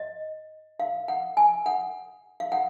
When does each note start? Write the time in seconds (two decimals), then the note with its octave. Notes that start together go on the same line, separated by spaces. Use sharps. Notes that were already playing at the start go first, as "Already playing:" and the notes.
Already playing: D#5
0.80 F5
1.08 F#5
1.37 G#5
1.66 F#5
2.40 F5
2.52 F#5